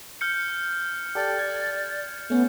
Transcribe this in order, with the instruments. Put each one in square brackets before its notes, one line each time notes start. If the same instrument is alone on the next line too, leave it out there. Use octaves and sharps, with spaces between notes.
[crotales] F6 G6 C#7
[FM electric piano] G4 A4 G5 [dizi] D5
[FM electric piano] G#6
[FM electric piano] A3 C#4 [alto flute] B3